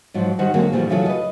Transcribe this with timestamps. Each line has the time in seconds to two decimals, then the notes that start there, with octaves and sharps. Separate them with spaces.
0.14 G#2 F3 F#3
0.39 D#3 G3 F#4 C5 F#5
0.54 D3 F#3 G#3 A#3 C4
0.72 A#2 E3 F3 G3 A3 F4
0.90 C#3 E3 F#3 F4 A4
1.06 B4 D#5